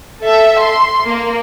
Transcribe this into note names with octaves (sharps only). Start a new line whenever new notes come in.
A4 E5
C6
A#3